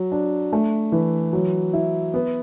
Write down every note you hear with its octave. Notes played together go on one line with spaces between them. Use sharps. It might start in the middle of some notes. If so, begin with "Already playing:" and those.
Already playing: F#3
D4
A3
E3
F#3
E4
B3